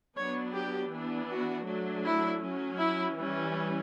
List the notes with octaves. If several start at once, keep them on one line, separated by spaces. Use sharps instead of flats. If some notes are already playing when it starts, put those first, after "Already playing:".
F#3 B3 D4 C#5
G4
E3 B3 D4
F#4
F#3 A3 D4
E4
F#3 C#4
E4
E3 G3 C#4